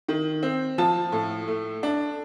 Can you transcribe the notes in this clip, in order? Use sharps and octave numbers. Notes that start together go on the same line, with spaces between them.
D#3
C4
F3 A5
A2
A3
D4